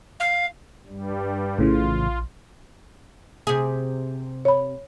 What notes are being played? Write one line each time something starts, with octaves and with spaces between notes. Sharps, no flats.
F5
G2 G3
A#1 A2 C#3 E3 F4
C3 G#4
C#5 B5